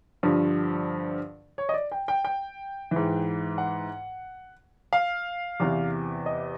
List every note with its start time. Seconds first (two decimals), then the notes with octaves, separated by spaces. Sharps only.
0.23 G2 D3 F3
1.58 C#5
1.69 D#5
1.74 D5
1.92 G5
2.08 G5
2.25 G5
2.91 G#2 E3
3.58 F#5
4.93 F5
5.60 E2 C3 E3
6.26 D#5